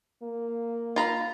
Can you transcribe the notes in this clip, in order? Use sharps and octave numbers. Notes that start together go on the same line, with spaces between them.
A#3
F4 A#5 B5